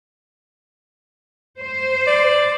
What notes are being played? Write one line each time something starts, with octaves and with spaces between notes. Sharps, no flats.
C5
D5